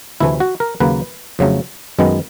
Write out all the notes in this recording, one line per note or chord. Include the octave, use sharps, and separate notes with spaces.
D2 C3 E3 A3 E4
F#4
A#4
D#2 C#3 F#3 A#3 B4
F2 C#3 F#3 A3
F#2 D#3 G#3 B3